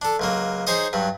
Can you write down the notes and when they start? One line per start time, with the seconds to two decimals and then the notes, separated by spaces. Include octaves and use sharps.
0.02 D4 A4
0.20 C#2 F#3 A#3
0.67 D#4 G#4 C5 C#5 D#5
0.93 G2 F#3